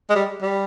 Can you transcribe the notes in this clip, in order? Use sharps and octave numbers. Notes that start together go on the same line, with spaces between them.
G#3
G3
G3